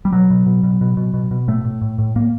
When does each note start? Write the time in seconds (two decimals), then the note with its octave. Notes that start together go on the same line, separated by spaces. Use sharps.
0.05 G3
0.12 B2 F#3
0.30 B2
0.46 B2
0.63 B2
0.81 B2
0.97 B2
1.14 B2
1.31 B2
1.48 A2 A3
1.64 A2
1.81 A2
1.99 A2
2.16 A2 A#3